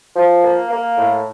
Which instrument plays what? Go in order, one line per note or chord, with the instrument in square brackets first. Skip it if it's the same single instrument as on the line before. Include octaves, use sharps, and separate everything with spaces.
[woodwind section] F3
A#3
A#3
A2